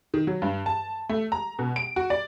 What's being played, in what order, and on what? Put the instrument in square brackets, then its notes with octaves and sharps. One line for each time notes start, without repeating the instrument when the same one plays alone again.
[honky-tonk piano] D#3
F#3
G2
A5
A3
A#5
B2
D7
F#4
D5